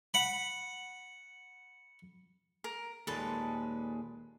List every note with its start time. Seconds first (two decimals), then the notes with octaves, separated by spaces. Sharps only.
0.14 F#5 B5
2.64 A#4
3.07 D#2 A#2 G#3 A4 B4 A5